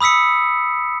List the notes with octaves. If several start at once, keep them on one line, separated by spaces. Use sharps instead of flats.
B5 D#6 E6 B6 C#7